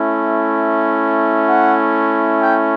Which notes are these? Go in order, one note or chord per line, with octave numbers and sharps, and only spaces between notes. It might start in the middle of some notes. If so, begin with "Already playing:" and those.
Already playing: A3 C#4 E4
F#5
G5